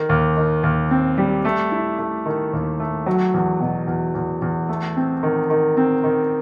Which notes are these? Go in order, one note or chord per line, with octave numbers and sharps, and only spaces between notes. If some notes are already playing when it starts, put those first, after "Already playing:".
Already playing: D#3
D#2
D#3
D#2
C4
G3
A3
E4
A3
D#3
D#2
A3
F#3
E2
B2
E2
E2
E2
A3
C4
D#3
D#3
C4
D#3